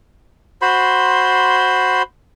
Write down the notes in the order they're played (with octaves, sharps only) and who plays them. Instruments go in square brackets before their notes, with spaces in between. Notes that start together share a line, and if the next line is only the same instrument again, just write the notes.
[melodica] F#4 C5 B5 C6